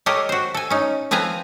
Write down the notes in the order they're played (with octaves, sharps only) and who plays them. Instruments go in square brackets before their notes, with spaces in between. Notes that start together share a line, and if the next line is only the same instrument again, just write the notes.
[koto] G4 A4 A#4 C#5 D#5
F#4 C5
A4 G#5
C#4 D#4
F3 C4 B4 G#5 A#5